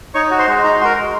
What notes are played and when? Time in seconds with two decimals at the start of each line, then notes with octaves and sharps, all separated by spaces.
0.15 D#4 C#5 C#6
0.31 F#4
0.39 C5 C6
0.48 G#3
0.63 D#4 A#5
0.74 C6
0.81 F#4 A#4 A#5
0.97 G#3